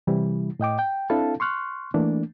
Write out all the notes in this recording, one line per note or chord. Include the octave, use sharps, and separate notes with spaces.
C3 E3 G3 E4
A2 D#5 G5 D6
G5
C4 D4 E4 A4 F5 A5
C6 C#6 F6 F#6
E3 A3 A#3 D4